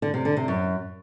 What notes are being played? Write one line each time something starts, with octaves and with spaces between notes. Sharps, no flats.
D3
C3
D3
C3
F#2